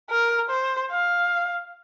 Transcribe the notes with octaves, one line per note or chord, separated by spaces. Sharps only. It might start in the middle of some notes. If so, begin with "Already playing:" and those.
A#4
C5
F5